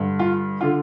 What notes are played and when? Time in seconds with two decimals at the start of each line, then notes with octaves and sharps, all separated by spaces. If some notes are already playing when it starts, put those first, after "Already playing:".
Already playing: G2 D3
0.19 F4
0.61 D3 F4